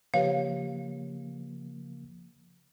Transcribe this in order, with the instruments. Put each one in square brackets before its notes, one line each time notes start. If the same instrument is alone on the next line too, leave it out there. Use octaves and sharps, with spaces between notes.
[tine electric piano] C#3 F3 A#3 [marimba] G4 B4 C#5 [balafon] F5